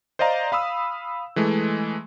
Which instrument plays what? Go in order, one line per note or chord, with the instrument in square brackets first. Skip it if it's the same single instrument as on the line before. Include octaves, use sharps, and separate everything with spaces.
[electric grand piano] C5 D5 D#5 F5 A#5
F5 B5 D#6 E6
E3 G#3 A3